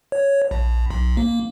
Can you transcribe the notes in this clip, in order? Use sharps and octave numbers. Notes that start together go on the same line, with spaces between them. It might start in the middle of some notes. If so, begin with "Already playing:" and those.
C#5
A#1
B1
A#3